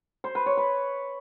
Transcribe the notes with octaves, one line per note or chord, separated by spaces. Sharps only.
C5
B4
C#5
B4